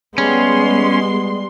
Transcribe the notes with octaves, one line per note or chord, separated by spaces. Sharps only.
G3 G#3 B3 C#4 C6